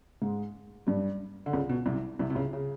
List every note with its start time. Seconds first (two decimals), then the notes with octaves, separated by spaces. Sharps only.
0.21 G#2 G#3
0.87 G2 G3
1.46 D3
1.53 C#2 C#3
1.69 B2
1.86 C2 C3
2.19 C2 C3
2.30 C3
2.35 C#2 C#3
2.53 C#3